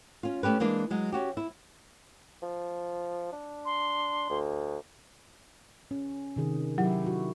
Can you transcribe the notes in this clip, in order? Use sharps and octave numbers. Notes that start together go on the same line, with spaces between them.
C#4 F4
A3 C#4 G4 B4
E3 G#3 A#3 D4
F#3 G#3
C#4 F#4 G4
E4
F3
D4
C6
D2
C#4
C3 D#3 G#4
F#3 E4 G4
D#4 F#4